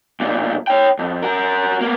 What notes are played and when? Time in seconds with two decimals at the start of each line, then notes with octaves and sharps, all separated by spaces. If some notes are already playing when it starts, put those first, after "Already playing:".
0.20 B1 A#2
0.67 C#5 G5
0.99 F2
1.22 F#4 A#4
1.81 A#3 B3